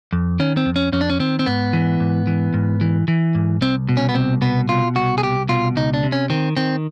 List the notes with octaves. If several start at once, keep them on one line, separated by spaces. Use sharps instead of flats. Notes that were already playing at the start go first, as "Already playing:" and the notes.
F2
D#3 C#4
C4
F2
C#4
F2 C#4
D4
C#4
D#3 C4
C4
G#2 B3
E3
G#2
E3
G#2
E3
E3
G#2
C2 C4
B2
C#4
B3
C2 C4
B2 B3
B2 F4
C2 F#4
G#4
C2 G4
B2 F4
C#2 D#4
D4
C3
C#4
D#3 C4
D#3 C4